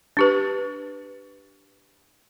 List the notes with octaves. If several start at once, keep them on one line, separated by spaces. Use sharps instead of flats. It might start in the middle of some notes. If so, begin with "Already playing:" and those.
D4 G4 B4